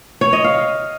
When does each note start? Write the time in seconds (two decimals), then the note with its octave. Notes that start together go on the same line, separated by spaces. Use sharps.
0.21 C#5
0.33 D#5
0.44 F5